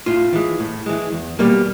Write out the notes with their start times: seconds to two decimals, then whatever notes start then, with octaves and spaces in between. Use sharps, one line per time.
0.06 A2 F4
0.33 E3 G#3
0.60 A2
0.86 E3 G#3
1.12 E2
1.39 B2 G3 A#3